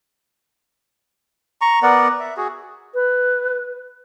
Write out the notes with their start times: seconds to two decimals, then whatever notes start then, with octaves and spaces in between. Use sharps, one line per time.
1.61 A#5 C#6
1.83 B3 A#4 D5 F#5
2.20 E5
2.37 F#4 G#4
2.95 B4